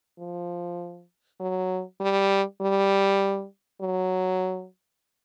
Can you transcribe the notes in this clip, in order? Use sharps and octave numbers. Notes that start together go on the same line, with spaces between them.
F3
F#3
G3
G3
F#3